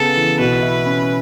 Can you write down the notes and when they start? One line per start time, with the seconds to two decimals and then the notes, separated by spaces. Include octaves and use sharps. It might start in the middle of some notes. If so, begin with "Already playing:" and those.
Already playing: C#3 B3 A4
0.16 E3
0.39 B2 B4
0.63 E4
0.86 C#4